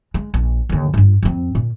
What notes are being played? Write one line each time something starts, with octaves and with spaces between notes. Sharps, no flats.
G#3
A#1
D#2 D3
G2 F4
F2 C4
A#2